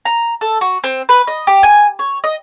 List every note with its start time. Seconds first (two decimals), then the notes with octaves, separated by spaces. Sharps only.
0.05 A#5
0.41 A4
0.61 F#4
0.84 C4
1.09 B4
1.27 D#5
1.47 G4
1.63 G#5
1.99 C#5
2.24 D#5